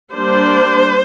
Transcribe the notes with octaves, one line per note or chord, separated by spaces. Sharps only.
G3 A#3 D4 C5